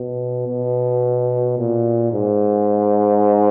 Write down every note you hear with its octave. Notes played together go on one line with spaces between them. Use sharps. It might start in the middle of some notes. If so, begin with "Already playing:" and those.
Already playing: B2
B2
A#2
G#2